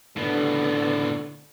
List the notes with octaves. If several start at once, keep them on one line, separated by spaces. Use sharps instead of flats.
A2 D3 B3